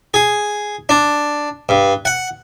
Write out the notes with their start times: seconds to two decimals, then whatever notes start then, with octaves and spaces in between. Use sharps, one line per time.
0.14 G#4
0.89 D4
1.69 G2
2.05 F#5